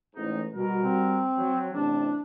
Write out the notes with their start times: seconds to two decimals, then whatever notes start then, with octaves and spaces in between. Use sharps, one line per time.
0.15 A1 G#2 D#4
0.54 B2 G3 F#4 A#4
0.84 C4
1.38 F#3
1.73 A1 C3 D4 A5